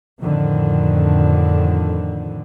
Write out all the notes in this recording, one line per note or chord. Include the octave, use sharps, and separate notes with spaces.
F2 A2 D3 D#3